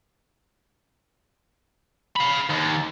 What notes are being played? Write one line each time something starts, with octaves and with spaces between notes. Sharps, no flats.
F5 B5
D#2